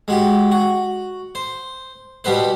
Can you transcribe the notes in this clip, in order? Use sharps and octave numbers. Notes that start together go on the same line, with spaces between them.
G#3 F#4 G4
F#4
C5
B2 G3 B3 B4 C5